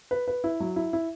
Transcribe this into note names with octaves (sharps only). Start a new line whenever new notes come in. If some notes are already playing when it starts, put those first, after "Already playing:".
B4
B4
E4
F#3
E4
E4